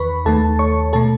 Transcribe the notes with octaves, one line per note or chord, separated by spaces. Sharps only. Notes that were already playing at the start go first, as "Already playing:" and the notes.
Already playing: E2 D#3 B4 B5 C#6
D#2 D#3 A3 A4 A5
C#5 C#6
B2 A3 A4 A5